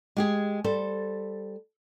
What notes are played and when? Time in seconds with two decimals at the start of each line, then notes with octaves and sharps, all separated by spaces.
0.17 G#3 G4 G#4
0.64 G3 A4 C5